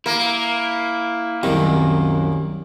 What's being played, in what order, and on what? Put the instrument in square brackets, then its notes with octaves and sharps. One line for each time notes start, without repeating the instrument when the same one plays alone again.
[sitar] A#3 [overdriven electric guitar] E4
[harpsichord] C2 D#3 [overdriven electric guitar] F#2